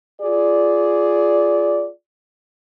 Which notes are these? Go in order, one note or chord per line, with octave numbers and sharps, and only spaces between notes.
F4 G#4 D5